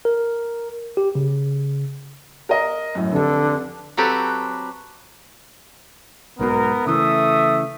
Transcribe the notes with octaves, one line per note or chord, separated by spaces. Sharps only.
A#4
G4
C#3
A#4 D#5 A#5
F#2 A2
F1 D3 A4
F#3 C4 F#4 G4 A4 B4
B1 G#2 B2 B3 A#4
C#3 E3 A3 E5 D#6